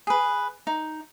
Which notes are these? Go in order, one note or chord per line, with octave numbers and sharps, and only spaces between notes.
G#4 B4
D#4